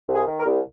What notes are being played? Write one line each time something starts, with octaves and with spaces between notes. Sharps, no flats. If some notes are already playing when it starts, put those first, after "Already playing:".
C2
G#4
D#3
A#4
C2